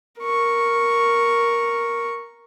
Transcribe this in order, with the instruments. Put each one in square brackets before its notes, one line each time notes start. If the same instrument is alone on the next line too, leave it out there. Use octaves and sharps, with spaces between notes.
[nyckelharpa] A#4 C#6